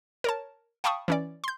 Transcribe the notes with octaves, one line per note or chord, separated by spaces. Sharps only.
A#4 C#5 A5
F5 G5 A5 B5 C#6 D#6
E3 C#4 D5
C6 G6